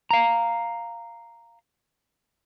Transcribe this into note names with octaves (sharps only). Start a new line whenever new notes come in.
F5 A#5